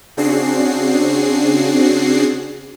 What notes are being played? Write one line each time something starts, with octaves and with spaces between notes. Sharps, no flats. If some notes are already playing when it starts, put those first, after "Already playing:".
C#3 C4 D4 F#4 G#4 C7